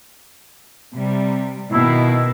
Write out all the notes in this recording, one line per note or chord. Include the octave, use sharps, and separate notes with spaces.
C3 G3
B2 D#3 E4